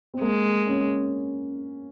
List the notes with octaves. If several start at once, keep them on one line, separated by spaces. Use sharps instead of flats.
C4
G#3 A#3
C#4